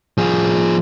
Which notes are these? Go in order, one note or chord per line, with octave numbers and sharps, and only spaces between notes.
F3 G#4